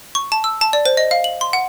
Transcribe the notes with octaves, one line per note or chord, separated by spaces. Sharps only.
C#6
A5
E6
A5
D5
C5
D#5
F5
F#7
C6
F#5